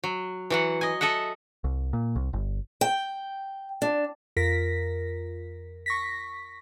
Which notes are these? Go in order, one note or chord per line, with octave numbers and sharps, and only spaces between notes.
F#3
E3 F#3 F#5
D#5 G#5
A4 D#5 E5 F#5
C2
A#2
C2
G1
G5
D4
F2 F4 A#4 A#6 B6
C#6 A#6 B6